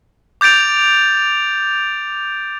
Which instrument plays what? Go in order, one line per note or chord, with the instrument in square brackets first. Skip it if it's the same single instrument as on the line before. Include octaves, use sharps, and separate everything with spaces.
[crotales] D6 G6 A6 D7 F7